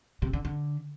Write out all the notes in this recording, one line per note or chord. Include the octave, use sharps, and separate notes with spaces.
C3
D3
D3